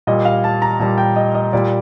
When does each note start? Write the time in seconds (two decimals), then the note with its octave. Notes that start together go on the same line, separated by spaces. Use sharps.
0.07 A#2 G3 D#5
0.25 F5
0.44 A5
0.62 A#5
0.79 A#2 G3 A5
0.98 G5
1.16 D#5
1.35 D#5
1.53 A#2 G3 D5